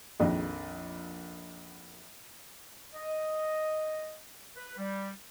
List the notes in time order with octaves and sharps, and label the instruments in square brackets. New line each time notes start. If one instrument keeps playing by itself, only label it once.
[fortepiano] A#1 F2 D#3
[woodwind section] D#5
B4
G3